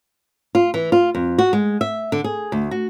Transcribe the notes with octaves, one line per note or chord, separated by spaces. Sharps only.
F4
E3
F4
F2
F#4
G#3
E5
D3
G#4
D2
F#4